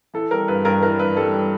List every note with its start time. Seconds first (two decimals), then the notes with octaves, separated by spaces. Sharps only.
0.14 E3 A4
0.31 G3 A#4
0.48 G2 B4
0.65 G2 A#4
0.82 E3 A#4
0.99 G2 B4
1.17 G3 A4
1.33 G3